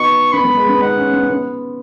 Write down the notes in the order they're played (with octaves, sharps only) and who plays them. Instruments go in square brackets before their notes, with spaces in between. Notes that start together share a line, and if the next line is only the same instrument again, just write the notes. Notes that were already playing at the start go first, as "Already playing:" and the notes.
Already playing: [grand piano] B3 D#4 F#4 [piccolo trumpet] C#6
[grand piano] B3 [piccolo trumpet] B5
[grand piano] B3
G#3
B3
[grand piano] D#4 [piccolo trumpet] F#5
[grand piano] C#4
B3
B3